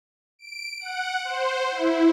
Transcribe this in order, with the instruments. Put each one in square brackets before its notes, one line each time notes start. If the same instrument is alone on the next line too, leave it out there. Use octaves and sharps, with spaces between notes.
[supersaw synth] D7
F#5
C5
E4